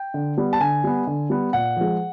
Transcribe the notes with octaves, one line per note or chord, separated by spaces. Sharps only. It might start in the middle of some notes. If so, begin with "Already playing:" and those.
Already playing: G5
D3
G3 B3
A5
D3 G#5
G3 B3
D3
G3 B3
A#2 F#5
F3 G#3